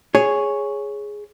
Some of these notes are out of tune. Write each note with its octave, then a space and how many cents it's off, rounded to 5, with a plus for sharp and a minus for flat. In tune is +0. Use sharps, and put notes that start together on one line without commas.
G#4 +0 C#5 +0